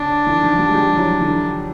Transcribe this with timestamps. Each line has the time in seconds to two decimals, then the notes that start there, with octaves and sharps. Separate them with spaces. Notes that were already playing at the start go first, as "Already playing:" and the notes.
Already playing: C#3 D4
0.27 D3 E3
0.43 D#3 F3
0.59 F3 G3
0.70 G#3
0.74 F3 G3
0.97 E3 F#3
1.20 D3 E3